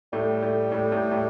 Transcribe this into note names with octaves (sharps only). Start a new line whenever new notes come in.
A2 G3 A3
A2 A3
A2 A3
A2 A3
A2 A3